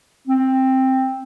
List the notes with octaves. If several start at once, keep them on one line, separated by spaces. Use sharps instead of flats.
C4